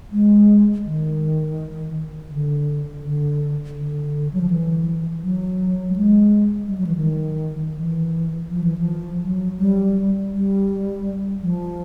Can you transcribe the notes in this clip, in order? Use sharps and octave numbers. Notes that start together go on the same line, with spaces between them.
G#3
D#3
D3
D3
D3
F#3
F3
E3
F#3
G3
G#3
G3
F#3
E3
D#3
E3
F3
E3
F3
F#3
G3
G3
F3